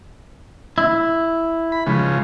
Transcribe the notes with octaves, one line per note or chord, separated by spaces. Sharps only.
E4
B5
C#3 F3 G#3